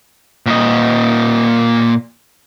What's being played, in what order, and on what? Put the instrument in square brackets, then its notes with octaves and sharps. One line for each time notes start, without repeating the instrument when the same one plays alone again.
[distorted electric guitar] A#2 D#5